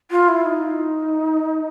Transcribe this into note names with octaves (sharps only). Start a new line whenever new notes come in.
F4
E4
D#4